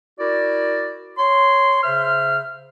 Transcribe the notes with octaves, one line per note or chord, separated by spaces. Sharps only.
E4 F#4 A#4 D5
C#5 C6
C#3 C5 E5 F6